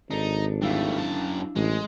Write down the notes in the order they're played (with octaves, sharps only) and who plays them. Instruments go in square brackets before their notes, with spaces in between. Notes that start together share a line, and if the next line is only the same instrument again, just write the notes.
[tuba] G#1 [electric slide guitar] D4 A4 [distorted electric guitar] D#4
[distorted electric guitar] G3 A3 [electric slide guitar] D4 E4 F5
[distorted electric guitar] F#2 A5
[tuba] A1 [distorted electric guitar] G#3